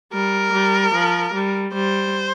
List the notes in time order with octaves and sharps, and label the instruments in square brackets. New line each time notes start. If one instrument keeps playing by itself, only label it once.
[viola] G3 [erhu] A#4
[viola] G3
F3
G3
[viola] G3 [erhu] C5